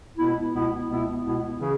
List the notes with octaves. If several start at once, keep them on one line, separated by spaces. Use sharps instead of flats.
C#2 B2 B3 E4
C#2 B2 B3 E4
C#2 B2 B3 E4
C#2 B2 B3 E4
C#3 E3 C#4 G#4